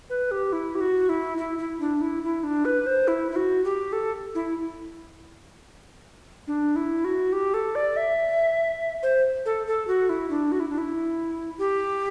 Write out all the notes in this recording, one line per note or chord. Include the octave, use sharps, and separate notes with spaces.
B4
G4
E4
G4
F#4
E4
E4
E4
D4
E4
E4
D4
B4
C5
E4
E4
F#4
G4
A4
E4
D4
E4
F#4
G4
A4
D5
E5
C5
A4
A4
F#4
E4
D4
F#4
E4
D4
E4
G4